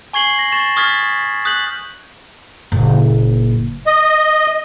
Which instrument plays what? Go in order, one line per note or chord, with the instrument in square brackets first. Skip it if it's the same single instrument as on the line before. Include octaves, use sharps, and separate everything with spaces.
[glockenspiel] G#5 C#6 G#6 C7 F#7 G7
A#6
C#6 A6 E7
C#6 D#6 F6 G#6 A6 B6
D#6 F#6 G6 B6 F#7
[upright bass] F#1 A#2
[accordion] D#5